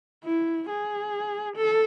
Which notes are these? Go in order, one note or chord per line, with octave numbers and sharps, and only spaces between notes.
E4
G#4
A4